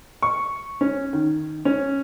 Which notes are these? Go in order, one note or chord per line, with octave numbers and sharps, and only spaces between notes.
C#6
C#4
D#3
C#4